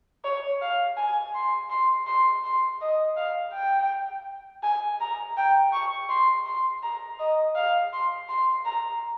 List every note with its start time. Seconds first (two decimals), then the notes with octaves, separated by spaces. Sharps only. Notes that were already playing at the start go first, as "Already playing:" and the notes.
0.24 C#5
0.61 F5
0.97 G#5
1.35 C6
1.70 C6
2.07 C6
2.44 C6
2.81 D#5
3.17 F5
3.53 G5
4.63 G#5
5.00 A#5
5.37 G5
5.73 C#6
6.09 C6
6.46 C6
6.83 A#5
7.19 D#5
7.55 F5
7.93 C6
8.29 C6
8.65 A#5